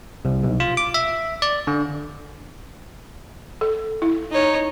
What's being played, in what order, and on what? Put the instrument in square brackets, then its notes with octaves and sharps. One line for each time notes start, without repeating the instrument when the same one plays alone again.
[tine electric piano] C2
B1
F4
D6
E5
D5
D3
[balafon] A4
E4
[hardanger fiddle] D#4 C#5